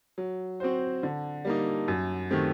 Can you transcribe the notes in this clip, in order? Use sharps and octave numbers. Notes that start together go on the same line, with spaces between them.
F#3
C4 F#4 C5
D3
G3 A#3 D#4
F#2
D#3 A3 C4 G4